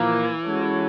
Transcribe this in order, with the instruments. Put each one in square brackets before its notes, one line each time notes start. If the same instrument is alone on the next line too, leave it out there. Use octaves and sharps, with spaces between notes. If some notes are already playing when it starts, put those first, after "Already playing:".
Already playing: [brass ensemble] A#2 F3 A#3 [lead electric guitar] E3
[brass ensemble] G#3 C#4 F#4 A4 C#5